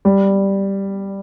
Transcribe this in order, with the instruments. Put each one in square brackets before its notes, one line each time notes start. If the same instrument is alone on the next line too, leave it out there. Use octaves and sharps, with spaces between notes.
[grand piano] G3